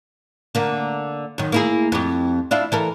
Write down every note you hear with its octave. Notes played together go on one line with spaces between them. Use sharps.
D3 A#3
F#2 D#3
A#3 E4 G#4
F2 G4
D4 E4 F4
E3 A4 A#4